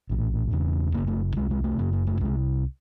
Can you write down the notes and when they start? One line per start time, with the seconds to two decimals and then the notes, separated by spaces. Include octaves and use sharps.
0.10 A#1 A2
0.51 E1 E2 C#3
0.94 F#1 F2 C#3 A#3
1.07 A3
1.36 C2 C3 G#3
1.51 G#3
1.64 A3
1.78 F#1 F#2 C#3 A#3
1.93 A#3
2.07 A3
2.21 C2 C3 G#3